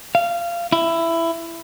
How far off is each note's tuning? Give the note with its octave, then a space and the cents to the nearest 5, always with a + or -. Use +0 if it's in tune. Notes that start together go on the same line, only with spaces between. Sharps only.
F5 -20
E4 +15